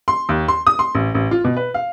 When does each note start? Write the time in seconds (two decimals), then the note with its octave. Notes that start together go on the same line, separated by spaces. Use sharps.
0.08 C6
0.29 D#2
0.48 C6
0.67 D#6
0.79 C6
0.95 A1
1.15 A1
1.31 F4
1.44 B2
1.57 B4
1.74 F5